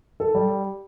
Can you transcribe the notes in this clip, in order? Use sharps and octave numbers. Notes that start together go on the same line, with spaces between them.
A4
G3